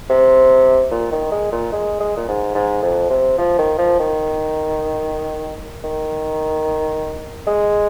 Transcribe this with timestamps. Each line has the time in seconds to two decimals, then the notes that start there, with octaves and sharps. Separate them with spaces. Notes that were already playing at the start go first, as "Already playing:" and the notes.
0.10 C3
0.91 A#2
1.12 D#3
1.32 G#3
1.52 A#2
1.73 G#3
2.01 G#3
2.17 A#2
2.29 G#2
2.55 G#2
2.82 F2
3.10 C3
3.38 F3
3.59 D#3
3.78 F3
3.99 D#3
5.84 D#3
7.47 G#3